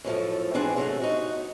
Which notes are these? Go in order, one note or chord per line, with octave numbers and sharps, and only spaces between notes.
F#2 A2 F3 A3
G#2 E3 C4 D4 G#4 F#5
C3 F#3 G#3 A3
D#4 F#4